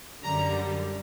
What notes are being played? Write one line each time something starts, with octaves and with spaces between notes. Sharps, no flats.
F#2 D3 G3 A#5